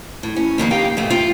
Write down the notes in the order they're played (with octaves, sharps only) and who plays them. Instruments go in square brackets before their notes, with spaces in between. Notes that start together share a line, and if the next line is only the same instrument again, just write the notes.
[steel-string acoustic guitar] A2
C#4
F2 D#3 G#3 A#3
D#4 G4 F5 G5
G#2 B2 A3
F4 G5